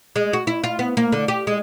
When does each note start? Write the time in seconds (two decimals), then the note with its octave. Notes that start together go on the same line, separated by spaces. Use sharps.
0.16 G#3
0.33 F#4
0.47 E4
0.64 F4
0.79 B3
0.97 A#3
1.12 D3
1.28 G4
1.47 G#3